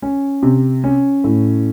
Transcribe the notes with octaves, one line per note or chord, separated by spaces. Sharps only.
C#4
C3
C#4
A2